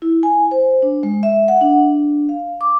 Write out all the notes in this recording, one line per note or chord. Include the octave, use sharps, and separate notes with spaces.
E4
G#5
C5
D4
G#3
E5
F#5
D4
F5
D6